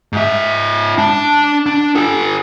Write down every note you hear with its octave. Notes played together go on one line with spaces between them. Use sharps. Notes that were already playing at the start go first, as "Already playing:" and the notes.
G#2 E5
D4 A5
D4
G4 A4